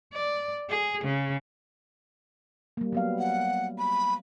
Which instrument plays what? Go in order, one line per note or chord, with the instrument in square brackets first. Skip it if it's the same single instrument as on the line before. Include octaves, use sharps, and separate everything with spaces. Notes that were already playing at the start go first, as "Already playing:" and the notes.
[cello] D5
G#4
C#3
[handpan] G3 A#3
F#3 B3 F5
[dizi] F#5
B5